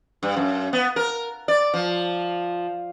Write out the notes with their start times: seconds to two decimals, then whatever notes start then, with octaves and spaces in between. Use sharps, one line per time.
0.23 G2
0.37 F#2
0.73 B3
0.96 A#4
1.48 D5
1.74 F3